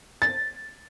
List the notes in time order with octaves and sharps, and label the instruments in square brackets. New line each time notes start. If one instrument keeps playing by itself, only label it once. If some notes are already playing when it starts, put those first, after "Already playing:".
[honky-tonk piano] A6